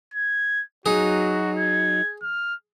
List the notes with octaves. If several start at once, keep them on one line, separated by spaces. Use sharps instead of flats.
G#6
F#3 D#4 F#4 G#4
G#6
F6